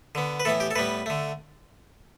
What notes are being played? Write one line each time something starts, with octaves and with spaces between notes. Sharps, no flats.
D3 B3
B4
A2 E3 B3 A4
G4
A4
A2 G3 B3 B4
D3 A3